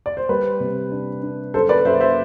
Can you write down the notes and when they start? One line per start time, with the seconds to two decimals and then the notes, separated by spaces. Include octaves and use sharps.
0.06 D5
0.17 C5
0.29 G3 B4
0.60 C3
0.92 D4
1.23 D4
1.54 F#2 A4 C5
1.69 B4 D5
1.85 F#2 C5 E5
2.00 C5 E5